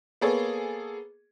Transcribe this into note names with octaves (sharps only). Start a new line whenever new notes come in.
A#3 B3 G#4 A4 C#5